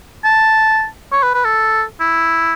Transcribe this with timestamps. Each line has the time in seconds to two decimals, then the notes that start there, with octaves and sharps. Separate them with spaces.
0.24 A5
1.12 C#5
1.23 B4
1.34 B4
1.45 A4
2.00 E4